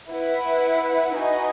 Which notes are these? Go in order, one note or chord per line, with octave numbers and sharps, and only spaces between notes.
E4 B4 F#5
D#4 F#4 B4 D#5 G#5